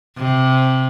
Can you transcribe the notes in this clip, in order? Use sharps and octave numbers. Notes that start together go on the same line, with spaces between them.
C3